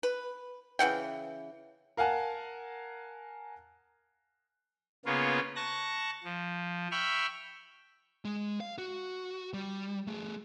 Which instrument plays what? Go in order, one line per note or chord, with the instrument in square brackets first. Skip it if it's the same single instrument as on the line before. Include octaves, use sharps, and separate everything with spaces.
[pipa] B4
C#3 E3 F#5 G5
[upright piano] A#4 F5 F#5 G#5 A5
[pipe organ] C#3 A#3 B3 C#4 F4
A5 C#6 F#6 A#6
F3
E5 G5 B5 C#6 F6
[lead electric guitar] G#3
F5
F#4
G3
A3 G#4